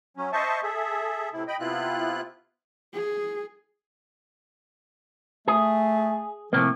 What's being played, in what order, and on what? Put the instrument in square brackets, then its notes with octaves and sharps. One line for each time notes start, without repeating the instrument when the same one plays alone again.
[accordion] F#3 C#4
C5 D#5 E5 A5 C#6
G#4 A4 E5
A2 C3 E4
D#5 G5 B5
C3 B3 E4 F4 F#6
[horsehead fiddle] G#4
[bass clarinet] A3 [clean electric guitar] G#4
[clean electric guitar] A2 C3 A#3 [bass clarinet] F3